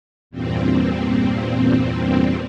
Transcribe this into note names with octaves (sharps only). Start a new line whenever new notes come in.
E2 G2 A#2 C4